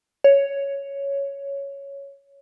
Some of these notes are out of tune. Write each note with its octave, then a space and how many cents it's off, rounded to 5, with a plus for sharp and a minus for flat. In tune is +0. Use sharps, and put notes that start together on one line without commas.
C#5 +5